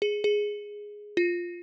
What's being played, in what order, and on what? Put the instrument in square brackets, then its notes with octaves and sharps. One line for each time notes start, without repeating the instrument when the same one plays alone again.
[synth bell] G#4
G#4
F4